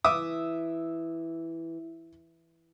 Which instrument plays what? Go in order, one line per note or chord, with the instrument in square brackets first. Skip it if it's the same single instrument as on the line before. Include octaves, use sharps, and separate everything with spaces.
[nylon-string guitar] E3 [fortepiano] E5 D6 D#6